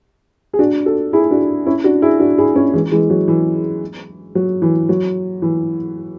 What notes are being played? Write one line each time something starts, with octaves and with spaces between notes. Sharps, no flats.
G#4
D4 F#4
F#4 A4
E4 G#4
D4 F#4
C#4 E4
D4 F#4
E4 G#4
D4 F#4
E4 G#4
C#4 E4
E3 G#3
E3 G#3
F#3
E3
F#3
E3
F#3
E3